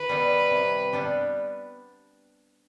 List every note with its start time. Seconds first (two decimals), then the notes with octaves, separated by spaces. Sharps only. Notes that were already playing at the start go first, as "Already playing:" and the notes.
Already playing: D#3 B4
0.09 G3 B3 D#4
0.51 C3
0.93 G3 B3 D4 G4